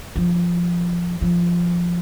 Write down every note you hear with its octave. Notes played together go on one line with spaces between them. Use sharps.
F3
F3